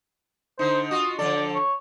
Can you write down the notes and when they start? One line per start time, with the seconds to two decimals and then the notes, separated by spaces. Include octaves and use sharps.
0.59 D3 D#4 C5
0.91 F4 F#4 D#5
1.19 D3 F3 A4 D5
1.55 C#5